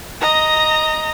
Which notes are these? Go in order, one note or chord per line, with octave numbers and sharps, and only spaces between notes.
D#5 A#5